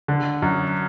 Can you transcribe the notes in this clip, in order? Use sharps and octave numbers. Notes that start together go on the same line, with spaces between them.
D3
F#2